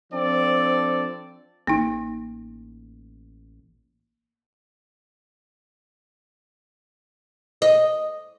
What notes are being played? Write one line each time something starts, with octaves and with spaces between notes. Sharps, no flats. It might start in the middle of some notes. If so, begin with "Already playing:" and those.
F3 C4 D4 A4 D5
A1 A#3 D#4
D#5